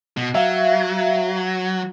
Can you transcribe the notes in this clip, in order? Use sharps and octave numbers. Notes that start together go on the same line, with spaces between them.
B2
F#3 E5 F5